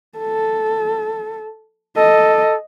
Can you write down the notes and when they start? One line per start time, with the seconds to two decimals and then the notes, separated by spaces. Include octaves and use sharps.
0.18 A4
1.97 A4 D#5